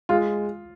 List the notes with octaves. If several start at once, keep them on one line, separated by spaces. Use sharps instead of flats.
G#3 F4